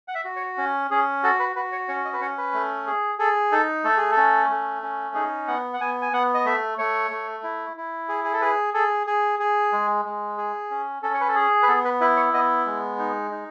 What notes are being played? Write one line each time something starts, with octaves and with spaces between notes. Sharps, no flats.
F#5
E5
F#4
C#5
C#4
C#4 G#4
F#4 A4
B4
F#4 B4
C#5
C#4 C#5
D#5
B4
C#4 C#5
B4
A3
G#4
G#4 A4
D#4 A4
A3 A4
G#4
A4
C#4
A3
C#4
D#4 G#4
B3 F#5
F#5
B3 G#5
G#5
B3 F#5
D#5
A3 E5
A3 C#5
A3
E4
E4
G#4
G#4
A4
G#4 B4
G#4 A4
G#4
G#4
G#3
G#3
G#4
C#4
C#4 A4
C#5
B4
A4
G#4
B4
B3 A4
B4
E4 B4
C#5
B3 D#5
G#3
D#4
D#4